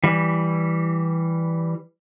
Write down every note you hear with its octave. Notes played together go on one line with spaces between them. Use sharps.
E3 G3